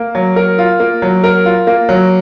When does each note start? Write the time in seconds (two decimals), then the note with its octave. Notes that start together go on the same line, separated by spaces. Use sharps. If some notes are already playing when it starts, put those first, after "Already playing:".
Already playing: A#3
0.15 F#3
0.36 A#4
0.58 F4
0.80 A#3
1.02 F#3
1.24 A#4
1.45 F4
1.67 A#3
1.89 F#3